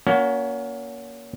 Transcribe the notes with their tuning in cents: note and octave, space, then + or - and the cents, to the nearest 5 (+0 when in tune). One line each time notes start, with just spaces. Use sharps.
A#3 +15 C#4 +30 F#4 +0